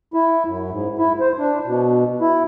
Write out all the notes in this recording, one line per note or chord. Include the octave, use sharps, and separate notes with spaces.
E4
F#2
G#2
E4
C5
D4
B2
E4